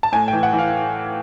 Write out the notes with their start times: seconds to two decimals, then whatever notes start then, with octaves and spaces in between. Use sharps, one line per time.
0.03 A5
0.12 A2 G#5
0.28 G5
0.33 E3
0.43 F#5
0.53 E3
0.59 F5